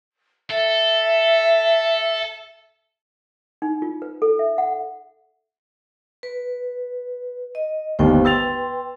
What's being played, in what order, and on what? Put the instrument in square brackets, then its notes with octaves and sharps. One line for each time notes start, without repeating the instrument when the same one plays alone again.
[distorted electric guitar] A4 [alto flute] E5
[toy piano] D#4
F4
B4
A4
E5
F#5
[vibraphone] B4
D#5
[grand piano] G1 D#2 [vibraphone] C5 G5
[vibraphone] B4 G5 C6 [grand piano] E6 A6 F7